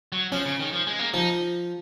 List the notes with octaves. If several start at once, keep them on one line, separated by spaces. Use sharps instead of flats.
F#3
F3 C#4
C#3
D#3
F3
G#3
A#3
F3 D#4